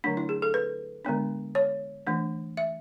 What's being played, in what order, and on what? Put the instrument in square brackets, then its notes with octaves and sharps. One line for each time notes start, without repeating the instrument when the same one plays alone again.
[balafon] D3 F#3 A3 D4
E4
G#4
A4
B4
D3 G#3 B3 D4
C#5
E3 A3 D4
E5